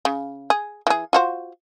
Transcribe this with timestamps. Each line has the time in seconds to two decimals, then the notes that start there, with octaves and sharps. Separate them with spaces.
0.05 C#3
0.50 G#4
0.87 E3 G#4
1.13 F4 F#4 C5